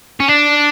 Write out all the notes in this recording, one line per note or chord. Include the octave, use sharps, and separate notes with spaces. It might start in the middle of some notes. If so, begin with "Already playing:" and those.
C#4
D4